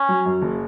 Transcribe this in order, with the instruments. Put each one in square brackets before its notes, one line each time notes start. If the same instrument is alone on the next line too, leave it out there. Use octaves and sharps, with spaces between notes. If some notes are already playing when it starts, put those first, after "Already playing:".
Already playing: [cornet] C#4
[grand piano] F#3
F#2
F#1